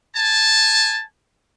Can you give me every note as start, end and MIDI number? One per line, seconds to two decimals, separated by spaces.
0.15 1.01 80
0.15 1.01 81